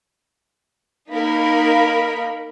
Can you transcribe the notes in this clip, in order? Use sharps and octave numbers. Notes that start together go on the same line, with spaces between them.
A#3 D#4 A#4 B5